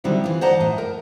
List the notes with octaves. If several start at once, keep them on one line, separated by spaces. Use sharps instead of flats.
D3 D#3 F#3 G3 C4 E4
E3 F4
C5 D5 D#5 F#5 A5 A#5
A2 F3 D#5
A#4